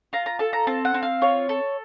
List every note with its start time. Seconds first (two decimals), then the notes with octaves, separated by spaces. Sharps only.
0.13 F4 A#5
0.26 A#5
0.39 A4 A5
0.53 A#5
0.67 C4 A5
0.85 F#5
0.94 C4
1.03 F5
1.21 F4 C#5
1.49 A4